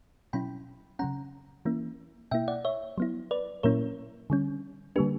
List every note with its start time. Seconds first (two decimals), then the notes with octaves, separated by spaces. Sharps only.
0.33 B2 F#3 C#4 E4 G5 B5
0.99 C#3 F#3 C#4 F#5 A#5
1.65 E3 A#3 C#4 E4
2.31 B2 A#3 E4 E5 G5
2.48 D5 F#5
2.65 C#5 E5
2.98 F#3 B3 E4
3.31 B4 D5
3.63 A#2 F#3 A#3 C#4 E4 A#4 C#5
4.30 D3 G3 C#4
4.96 D3 G3 A#3 D4 G4 B4